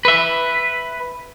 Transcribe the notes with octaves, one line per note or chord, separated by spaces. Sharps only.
B4 E5